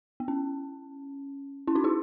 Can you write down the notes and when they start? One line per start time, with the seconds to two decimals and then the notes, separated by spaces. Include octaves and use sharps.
0.20 B3
0.28 C#4
1.67 C#4 E4
1.75 D#4 F#4
1.84 E4 G#4